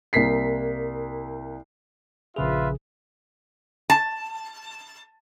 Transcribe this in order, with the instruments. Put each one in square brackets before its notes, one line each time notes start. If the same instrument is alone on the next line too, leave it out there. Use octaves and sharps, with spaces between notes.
[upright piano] C2 A#3 B6 C7
[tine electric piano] A#1 C#3 G#4 [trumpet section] F4 B4 E5
[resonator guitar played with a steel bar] A5